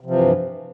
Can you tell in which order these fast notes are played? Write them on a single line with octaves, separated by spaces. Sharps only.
C3 F3 E3 G2